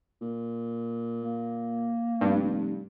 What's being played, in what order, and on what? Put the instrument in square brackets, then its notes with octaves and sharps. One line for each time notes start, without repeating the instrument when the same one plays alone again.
[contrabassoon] A#2
[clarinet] A#3
[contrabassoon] F1 [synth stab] G2